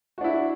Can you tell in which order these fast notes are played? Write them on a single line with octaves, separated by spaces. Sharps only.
F#4 D4 E4